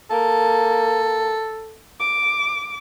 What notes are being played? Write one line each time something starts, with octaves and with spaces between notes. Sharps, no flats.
A#3 A4
D6